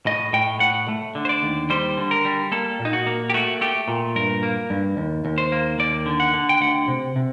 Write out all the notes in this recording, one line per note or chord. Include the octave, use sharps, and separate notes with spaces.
A2 D#5
A2 G5
A2 F#5
A3
D3
C5
D5
D#2
G3 C5
D3
A#4
G3
A#3 A4
A#2
D#4
F#4
A#3
G4
A3 F#4
A3 G4
A#2
G2 A#4
A#3
G2
D#2
D#2
C5
A#3
D#2 D5
D3
F#5
D3
G5
D2 F#5
C3
C3